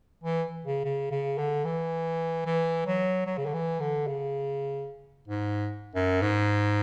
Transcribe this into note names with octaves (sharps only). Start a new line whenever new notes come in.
E3
C#3
C#3
C#3
D3
E3
E3
F#3
F#3
C#3
D3
E3
D3
C#3
G#2
F#2
G#2